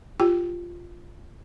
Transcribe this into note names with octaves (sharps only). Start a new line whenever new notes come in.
F4 G4 G5